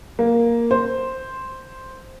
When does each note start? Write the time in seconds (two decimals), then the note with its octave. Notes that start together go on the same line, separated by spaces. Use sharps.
0.19 A#3
0.71 C5